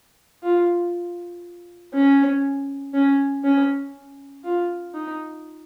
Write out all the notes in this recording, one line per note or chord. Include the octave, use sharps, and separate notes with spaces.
F4
C#4
C#4
C#4
F4
D#4